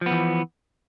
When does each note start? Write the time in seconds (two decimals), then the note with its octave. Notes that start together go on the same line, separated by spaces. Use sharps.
0.01 F3
0.06 B3
0.11 E3